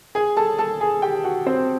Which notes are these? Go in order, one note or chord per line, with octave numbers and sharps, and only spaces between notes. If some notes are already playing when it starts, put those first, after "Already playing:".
G#4 G#5
A4 A5
A4 A5
G#4 G#5
G4 G5
F#4 F#5
C4 C5